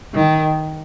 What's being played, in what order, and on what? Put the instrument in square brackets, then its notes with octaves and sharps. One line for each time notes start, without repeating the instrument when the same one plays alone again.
[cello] D#3